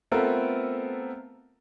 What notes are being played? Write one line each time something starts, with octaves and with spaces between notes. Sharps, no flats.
A3 B3 C4 F4 A4 A#4